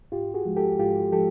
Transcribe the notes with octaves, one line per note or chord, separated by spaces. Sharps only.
G#2 F4 G4
F#4 G#4
F3 G#3
G4 A4
G#2 F4 G4
F3 G#3 G4 A4